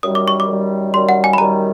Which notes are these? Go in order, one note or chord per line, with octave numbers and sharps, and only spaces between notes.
F#2 D#3 G3 D#6
D6
C#6
D6
F#2 D#3 G3
F#2 D#3 G3 C6
F#5
G#5
B5
F#2 D#3 G3 A#5